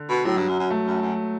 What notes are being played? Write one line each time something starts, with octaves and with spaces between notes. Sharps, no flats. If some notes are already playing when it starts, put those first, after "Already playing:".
Already playing: D3
B2
A2 F#3
G2
F#2
F#2
A3
F#2
F#2